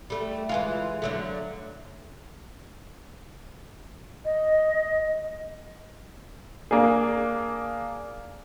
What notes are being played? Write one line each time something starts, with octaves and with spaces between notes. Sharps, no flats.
G3 A3
E3 G#3 F4
D3 F#3 A3
D#5
A#3 D4 G#4